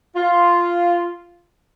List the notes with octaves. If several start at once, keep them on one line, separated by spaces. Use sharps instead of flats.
F4